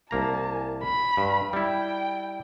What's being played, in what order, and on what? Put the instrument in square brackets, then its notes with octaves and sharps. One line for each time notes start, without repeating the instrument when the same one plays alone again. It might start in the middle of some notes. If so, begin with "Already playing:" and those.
[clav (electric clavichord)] C2 A#3 A#5 [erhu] A5
[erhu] B5
[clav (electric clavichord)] G2
[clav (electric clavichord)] G3 E4 [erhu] G5